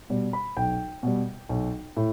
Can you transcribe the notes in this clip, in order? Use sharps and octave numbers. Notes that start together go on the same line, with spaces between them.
B2 G3
B5
B1 G5
B2 G3
B1
A2